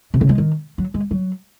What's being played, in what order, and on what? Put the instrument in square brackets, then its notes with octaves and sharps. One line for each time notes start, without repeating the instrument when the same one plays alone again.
[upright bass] C3
C#3
G#3
D#3
F#3
G#3
F#3